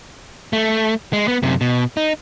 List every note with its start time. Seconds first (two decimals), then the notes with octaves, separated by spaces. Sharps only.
0.53 A3
1.13 G#3
1.28 B3
1.43 F#2 C3
1.61 B2
1.97 D#4